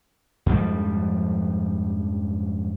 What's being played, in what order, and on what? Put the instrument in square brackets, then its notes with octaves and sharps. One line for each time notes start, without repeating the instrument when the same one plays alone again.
[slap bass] F2 G#2 F3 G3